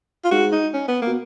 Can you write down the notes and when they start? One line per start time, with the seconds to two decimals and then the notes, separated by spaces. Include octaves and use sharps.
0.24 F4
0.31 G#2 F#4
0.52 D#4
0.74 C#4
0.88 B3
1.02 B2 A#3